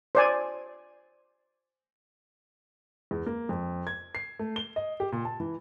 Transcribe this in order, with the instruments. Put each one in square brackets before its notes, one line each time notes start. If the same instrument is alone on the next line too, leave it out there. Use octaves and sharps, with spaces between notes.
[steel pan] C5 D5 G#5
[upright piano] E2
A#3
F2
G#6
C7
A3
G7
D#5
G4
A#2
A5
E3